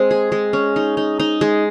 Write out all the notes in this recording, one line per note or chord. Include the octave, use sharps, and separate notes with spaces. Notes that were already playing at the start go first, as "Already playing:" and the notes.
Already playing: G#3 C4
G#4
G#3
C#4
D#4
D#4
D#4
G#3